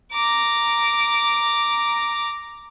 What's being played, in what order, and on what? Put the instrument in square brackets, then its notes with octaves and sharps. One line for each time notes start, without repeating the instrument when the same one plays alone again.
[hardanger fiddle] A#5 D6